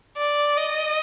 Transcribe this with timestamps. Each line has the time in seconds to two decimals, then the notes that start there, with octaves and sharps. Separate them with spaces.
0.17 D5
0.57 D#5